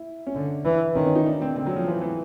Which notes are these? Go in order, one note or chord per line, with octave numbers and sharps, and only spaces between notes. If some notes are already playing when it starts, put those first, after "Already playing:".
Already playing: E4
C#4
D3 D4
E3
D#3 C#4
C#4
D#4
D4
C4
D3 C4
F#3
F3
E3 F3
E3